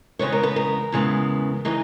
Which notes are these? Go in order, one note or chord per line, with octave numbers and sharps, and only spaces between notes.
E2 C#3 G#3 B3 C#5
A#4
B4
A#4
E2 C#3 G#3 B3
C#3 E3 G#3 D#4